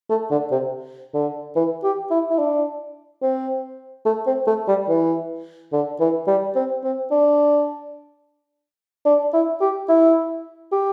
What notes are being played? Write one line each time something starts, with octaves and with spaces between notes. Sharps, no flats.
A3
D3
C3
D3
E3
G4
E4
E4
D4
C4
A3
C4
A3
G3
E3
D3
E3
G3
C4
C4
D4
D4
E4
G4
E4
G4